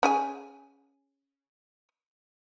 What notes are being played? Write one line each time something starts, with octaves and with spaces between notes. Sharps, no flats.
C#4 G#4 G#5